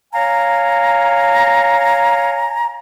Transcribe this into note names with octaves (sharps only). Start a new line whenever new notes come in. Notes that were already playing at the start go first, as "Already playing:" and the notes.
C#5 F5 G#5 A#5